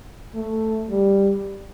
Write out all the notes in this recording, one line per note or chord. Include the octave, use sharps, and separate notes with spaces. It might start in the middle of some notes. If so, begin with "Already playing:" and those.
A3
G3